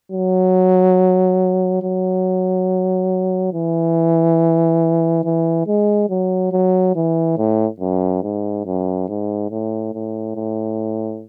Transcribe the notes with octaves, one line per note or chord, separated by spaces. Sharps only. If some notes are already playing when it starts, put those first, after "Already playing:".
F#3
F#3
E3
E3
G#3
F#3
F#3
E3
A2
F#2
G#2
F#2
G#2
A2
A2
A2